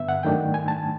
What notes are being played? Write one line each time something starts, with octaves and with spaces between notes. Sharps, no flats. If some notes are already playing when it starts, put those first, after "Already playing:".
Already playing: G2 D3 B3 E5
F#5
G#2 D#3 F#3 A3 D4 G5
G#5
A5